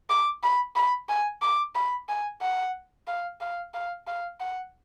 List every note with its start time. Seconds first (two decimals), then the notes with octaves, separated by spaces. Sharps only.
0.10 D6
0.43 B5
0.76 B5
1.09 G#5
1.42 D6
1.75 B5
2.09 G#5
2.42 F#5
3.08 F5
3.41 F5
3.74 F5
4.07 F5
4.40 F#5